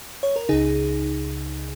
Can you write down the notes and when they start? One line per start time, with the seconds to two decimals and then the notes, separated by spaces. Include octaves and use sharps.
0.23 C#5
0.36 A#4
0.49 C#2 C#3 D#4 G#4